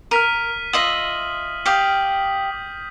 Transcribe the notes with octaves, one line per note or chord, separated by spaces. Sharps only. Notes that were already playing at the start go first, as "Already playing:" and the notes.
A#4 F6 B6 D#7
F4 D#5 E5 D#6 F#7
G4 F5 D#6 G6 B6